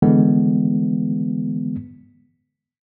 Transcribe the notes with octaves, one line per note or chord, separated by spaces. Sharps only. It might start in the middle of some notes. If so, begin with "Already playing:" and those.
D3 E3 G#3 B3